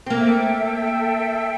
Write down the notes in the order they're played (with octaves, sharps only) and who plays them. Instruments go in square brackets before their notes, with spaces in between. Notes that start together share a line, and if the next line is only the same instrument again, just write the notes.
[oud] C4
[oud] A#3 [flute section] A4 E5 G5